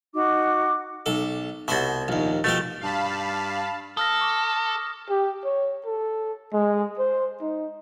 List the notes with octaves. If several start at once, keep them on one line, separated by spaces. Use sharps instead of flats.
D#4 F#4 D6
B1 A4
C2 B2 F#4 C5 E5
A#1 D#2
B2 F3 A3 G4
G2 F5 A5 B5
A4 D#6 F6 A#6
C#6 D6 A#6
G4
C#5
A4
G#3
C5
D#4